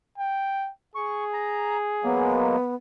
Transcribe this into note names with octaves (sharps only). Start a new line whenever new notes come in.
G5
G#4 C#6
A#5
F#3 G#3 A#3 B3